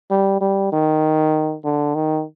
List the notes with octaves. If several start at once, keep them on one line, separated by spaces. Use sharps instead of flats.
G3
G3
D#3
D3
D#3